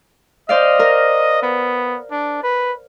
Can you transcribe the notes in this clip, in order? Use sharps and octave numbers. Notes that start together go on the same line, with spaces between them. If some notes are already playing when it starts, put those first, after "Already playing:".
C5 D5 D#5 F5
A#4
B3
D4
B4